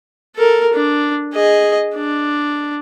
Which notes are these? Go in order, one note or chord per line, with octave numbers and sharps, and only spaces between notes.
A4 A#4
D4
G#4 D#5
D4